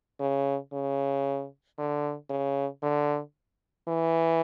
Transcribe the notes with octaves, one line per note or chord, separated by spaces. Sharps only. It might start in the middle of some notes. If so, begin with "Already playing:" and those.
C#3
C#3
D3
C#3
D3
E3